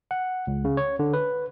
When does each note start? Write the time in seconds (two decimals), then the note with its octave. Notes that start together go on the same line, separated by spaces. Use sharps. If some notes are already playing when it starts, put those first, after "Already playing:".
0.11 F#5
0.47 C#2
0.65 C#3
0.77 C#5
0.99 D3
1.14 B4